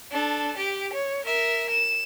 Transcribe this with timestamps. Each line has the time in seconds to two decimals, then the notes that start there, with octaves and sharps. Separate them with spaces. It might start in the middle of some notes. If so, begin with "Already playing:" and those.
0.12 D4 A4
0.57 G4 D7
0.93 C#5
1.25 A#4 E5
1.70 E7